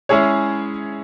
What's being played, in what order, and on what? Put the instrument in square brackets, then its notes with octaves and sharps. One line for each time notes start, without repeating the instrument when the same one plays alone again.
[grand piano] G#3 C#4 E4 G#4 C#5